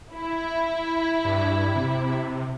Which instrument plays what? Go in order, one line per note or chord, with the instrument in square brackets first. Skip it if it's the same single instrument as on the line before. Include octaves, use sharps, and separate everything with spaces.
[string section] E4
[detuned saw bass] G2
C3